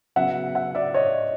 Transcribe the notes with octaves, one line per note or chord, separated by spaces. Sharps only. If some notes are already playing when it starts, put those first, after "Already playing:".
C#3 F#3 B3 E5 F#5
E5 F#5
D5 E5
C#5 D#5